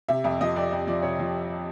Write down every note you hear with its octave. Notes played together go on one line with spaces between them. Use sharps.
C3 E5
F2 E5
F3 D#5
F2 D5
F2
F3 D5
C3 C#5
F3